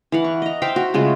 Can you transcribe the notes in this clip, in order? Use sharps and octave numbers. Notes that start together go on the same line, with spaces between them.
E3 F5 F#5
C#6
D#5 A#5
C5 E5 F5 G5
F#4
C#3 G#3 A3 F4